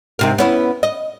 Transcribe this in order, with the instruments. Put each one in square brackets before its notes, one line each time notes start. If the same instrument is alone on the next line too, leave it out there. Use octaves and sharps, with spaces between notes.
[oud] G#2 C3 A#4
B3 C#4 E4
D#5